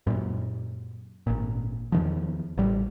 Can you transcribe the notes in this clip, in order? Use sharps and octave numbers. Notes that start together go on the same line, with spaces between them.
F#2 A#2
G#1 A#2
E2 D#3 F3
A1 G3